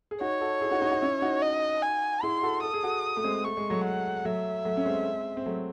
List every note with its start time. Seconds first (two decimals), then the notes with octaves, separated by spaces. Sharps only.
0.11 G#4
0.21 D#4 F#4 C#5
0.41 F#4 A4
0.61 E4 G#4
0.71 D#4 F#4
0.81 D#4 F#4
0.91 D#4 F#4
1.01 C#4 E4
1.22 D#4 F#4
1.42 D#5
1.82 G#5
2.23 E4 G#4 C6
2.43 F#4 A4
2.63 A4 D#6
2.74 G#4
2.83 F#4 A4
3.17 A3
3.24 G#3 C4
3.44 A3 C#6
3.57 G#3
3.70 F#3 A3
3.84 F#5
4.25 F#3 A3 E5
4.65 F#3 A3
4.77 C#4
4.85 G#3 C4
5.37 C4
5.46 F#3 A3